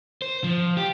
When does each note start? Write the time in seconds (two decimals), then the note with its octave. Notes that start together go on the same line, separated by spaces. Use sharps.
0.22 C5
0.44 F3
0.77 G4